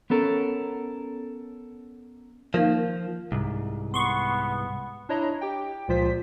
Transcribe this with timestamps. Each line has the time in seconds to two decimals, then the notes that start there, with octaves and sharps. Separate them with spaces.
0.10 B3 C#4 A4 A#4
2.54 D#3 F3 A#3
3.32 C2 G#2
3.94 B3 C6 C#6
5.09 D4 E4 C#5 D#5 A#5
5.41 G4 G5
5.88 C#2 A#2 F3 F4 C5 B6